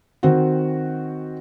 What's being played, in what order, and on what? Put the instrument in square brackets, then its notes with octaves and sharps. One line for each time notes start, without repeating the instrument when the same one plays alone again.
[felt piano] D#3 C4 F#4